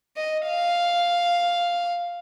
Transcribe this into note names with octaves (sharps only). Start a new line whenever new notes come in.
D#5
F5